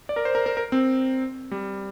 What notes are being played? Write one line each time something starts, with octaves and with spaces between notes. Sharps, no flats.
D5
A#4
C5
A#4
A#4
A#4
C4
G3